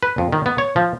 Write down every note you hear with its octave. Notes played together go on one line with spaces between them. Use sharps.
B4
F2
D#3
B3
C#5
F3